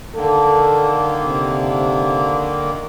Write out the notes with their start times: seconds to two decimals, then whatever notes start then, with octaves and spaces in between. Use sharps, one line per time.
0.15 D3 D#3 A#3 A4
1.26 C3